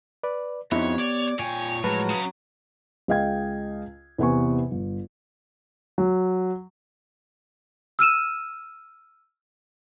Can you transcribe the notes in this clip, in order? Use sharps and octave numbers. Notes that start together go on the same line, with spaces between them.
B4 D5
F2 B3 D#4 E4 G4 C#5
D5 G#6
A#2 C#5 G5 G#5
A2 F3 F#3 G#3 B4 A5 B5
C#3
C#2 G#4 D#5 F5 G5 G#6
E2 C3 B3 G#5 C#6
G1
F#3
E6 F6 D#7 E7